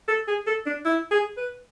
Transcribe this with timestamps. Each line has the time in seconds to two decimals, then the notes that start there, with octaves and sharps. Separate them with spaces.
0.08 A4
0.28 G#4
0.47 A4
0.66 D4
0.85 E4
1.11 G#4
1.37 B4